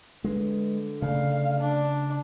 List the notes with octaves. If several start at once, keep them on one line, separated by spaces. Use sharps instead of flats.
D3 G#3 B4
C#3 A3 D5 F5
D4